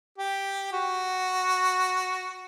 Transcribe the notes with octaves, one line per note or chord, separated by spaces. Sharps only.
G4
F#4